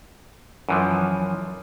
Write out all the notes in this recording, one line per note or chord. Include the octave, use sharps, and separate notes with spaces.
F#2 E3 F3